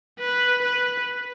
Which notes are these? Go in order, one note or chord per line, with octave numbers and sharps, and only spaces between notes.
B4
B4